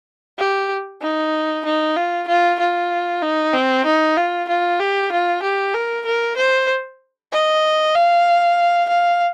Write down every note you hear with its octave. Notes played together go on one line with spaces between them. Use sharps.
G4
D#4
D#4
F4
F4
F4
D#4
C4
D#4
F4
F4
G4
F4
G4
A#4
A#4
C5
D#5
F5
F5